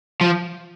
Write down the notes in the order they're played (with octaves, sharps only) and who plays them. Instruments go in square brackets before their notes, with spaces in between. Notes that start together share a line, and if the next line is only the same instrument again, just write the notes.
[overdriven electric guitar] F3